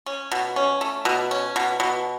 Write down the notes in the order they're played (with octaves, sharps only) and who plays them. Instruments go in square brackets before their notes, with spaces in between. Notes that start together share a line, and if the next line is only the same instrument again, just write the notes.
[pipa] C#4
B2
C#4
A3
B2
C#4
B2
B2